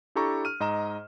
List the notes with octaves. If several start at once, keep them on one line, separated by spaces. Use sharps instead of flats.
D4 E4 G4 A4 A#5 C#6
F6 D#7
G#2 D#5 A#5 E7